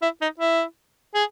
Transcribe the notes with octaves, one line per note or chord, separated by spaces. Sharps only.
E4
D#4
E4
G#4